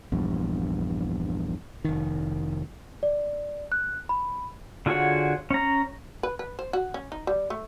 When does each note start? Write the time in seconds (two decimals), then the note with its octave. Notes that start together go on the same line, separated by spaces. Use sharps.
0.12 A#1 E2 G2
1.85 F1 D#3
3.03 D5
3.72 F#6
4.09 B5
4.86 D3 F4 F#4 G#4 C#5
5.51 C#4 A#5
6.23 B4
6.39 B4
6.59 C5
6.73 F#4
6.94 C#4
7.12 D#4
7.27 G3
7.50 A3